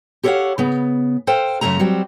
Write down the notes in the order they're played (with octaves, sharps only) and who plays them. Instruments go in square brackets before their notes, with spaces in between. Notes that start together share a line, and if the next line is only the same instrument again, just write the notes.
[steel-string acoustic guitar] G4 A4 C#5 D5 F5 F#5
C#3 B3
A4 C5 F5 G5
F#2 C#3 E3 G#3 A3 A#5
F#3 G3 C4